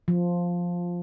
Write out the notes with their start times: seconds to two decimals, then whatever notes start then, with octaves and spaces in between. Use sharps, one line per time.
0.08 F3